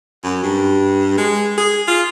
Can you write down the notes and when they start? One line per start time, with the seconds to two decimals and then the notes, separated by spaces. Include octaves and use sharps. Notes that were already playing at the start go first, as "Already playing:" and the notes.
0.24 F#2
0.43 G2
1.18 G#3
1.58 G#4
1.88 F4